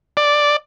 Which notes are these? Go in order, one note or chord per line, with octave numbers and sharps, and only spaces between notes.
D5